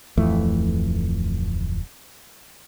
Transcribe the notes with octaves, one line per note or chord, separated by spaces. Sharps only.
D1 F2 E3 A3